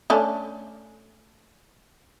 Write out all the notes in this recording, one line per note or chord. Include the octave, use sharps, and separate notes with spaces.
A3 C#4 D4